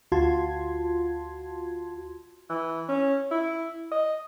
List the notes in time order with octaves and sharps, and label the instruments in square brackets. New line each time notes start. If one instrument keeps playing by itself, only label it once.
[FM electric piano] D2 F4 F#4 A5 C6 G#6
[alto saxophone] E3
C#4
E4
D#5